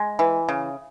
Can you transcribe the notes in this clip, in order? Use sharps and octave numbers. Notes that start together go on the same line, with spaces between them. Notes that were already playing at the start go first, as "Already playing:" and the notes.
Already playing: G#3
E3
C#3